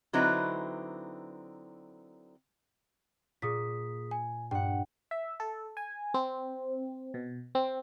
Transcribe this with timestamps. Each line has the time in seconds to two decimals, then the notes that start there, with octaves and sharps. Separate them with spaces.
0.13 D3 F#3 C4 D#4 E4 B4
3.42 A#2 G#4 D#6 B6
4.11 G#5
4.51 G2 F#5 G5
5.11 E5
5.40 A4
5.77 G#5
6.14 C4
7.14 B2
7.55 C4